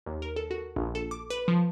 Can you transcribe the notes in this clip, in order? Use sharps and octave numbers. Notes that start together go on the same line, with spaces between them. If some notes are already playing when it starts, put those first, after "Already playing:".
D#2
A#4
A4
F#4
A#1
A4
D6
B4
F3